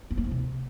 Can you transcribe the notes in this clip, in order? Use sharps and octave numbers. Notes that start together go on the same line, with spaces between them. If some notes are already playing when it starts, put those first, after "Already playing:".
B3
A#3
F3
C3